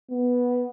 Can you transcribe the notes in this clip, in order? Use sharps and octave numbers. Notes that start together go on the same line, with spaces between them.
B3